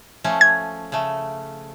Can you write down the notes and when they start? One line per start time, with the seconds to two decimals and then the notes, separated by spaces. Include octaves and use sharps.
0.24 F3 A3 C#4
0.41 G#6
0.92 C#3 A3